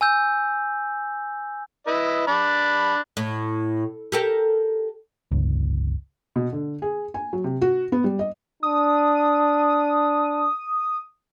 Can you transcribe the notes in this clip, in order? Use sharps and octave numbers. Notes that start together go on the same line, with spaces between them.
G#5 E6 G6
E4 B4 D#5
D4 B5 D6
A2
G4 A4 A#4
G1 C#2
B2
D3
G#4
G#5
F#3
C3
F#4
B3
G3
D#5
D4 D#6